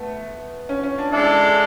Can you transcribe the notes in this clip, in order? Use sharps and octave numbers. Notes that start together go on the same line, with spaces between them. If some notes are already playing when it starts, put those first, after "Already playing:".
Already playing: A3 B3
C#4
C#4
D4
G#3 D4 E4 A4